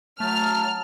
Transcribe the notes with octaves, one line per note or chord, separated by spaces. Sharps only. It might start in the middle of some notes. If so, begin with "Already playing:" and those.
F#3 A3 A5 F6